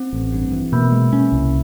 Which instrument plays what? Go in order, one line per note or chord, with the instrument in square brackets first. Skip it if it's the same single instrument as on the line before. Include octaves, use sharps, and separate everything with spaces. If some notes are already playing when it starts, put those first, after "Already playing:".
Already playing: [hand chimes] C4
[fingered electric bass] A1
G2
E3
[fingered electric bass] B2 [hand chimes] A#3
[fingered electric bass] G#3
C#4
C2